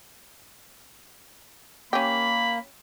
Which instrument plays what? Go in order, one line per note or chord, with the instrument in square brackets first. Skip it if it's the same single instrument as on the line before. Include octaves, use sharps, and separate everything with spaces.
[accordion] A#3 [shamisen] C#4 G4 [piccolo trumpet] B5